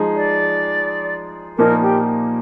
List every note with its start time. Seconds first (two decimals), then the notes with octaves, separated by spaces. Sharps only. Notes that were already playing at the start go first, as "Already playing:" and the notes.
Already playing: F3 G#3 D#4 G#4
0.16 D5
1.57 A#2 F3 A#3 D#4 A#4
1.82 G4